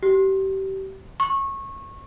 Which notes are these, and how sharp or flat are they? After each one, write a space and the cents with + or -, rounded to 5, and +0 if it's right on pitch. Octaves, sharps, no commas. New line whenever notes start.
G4 -30
C#6 -25